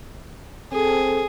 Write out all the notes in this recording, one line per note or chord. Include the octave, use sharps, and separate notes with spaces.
C4 G#4 A4